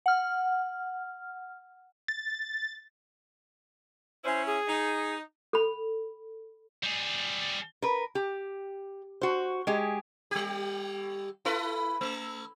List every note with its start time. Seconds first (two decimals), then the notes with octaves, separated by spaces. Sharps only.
0.06 F#5 F6
2.08 A6
4.24 C#4 E4 C5
4.46 G#4
4.68 D#4
5.53 A4 B5
6.83 G3 G#4
7.82 A#4 B4
8.15 G4
9.22 F#4 C5
9.67 G#3 G4 G#4
10.31 G3 G4
11.45 E4 A4 B4
12.01 A3